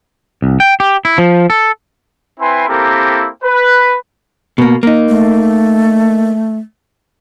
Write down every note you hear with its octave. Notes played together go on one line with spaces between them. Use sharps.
C2
G5
G4
E4
F3
A4
C4 E4 B4 G#5 C6
A#3 C4 E4 G4 A4 A#4
B4
B2 A#3
A#3 D#4
A3